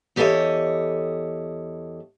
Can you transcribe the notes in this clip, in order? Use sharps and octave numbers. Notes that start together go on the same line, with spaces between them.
E2 G4 A4 C5 C#5 D#5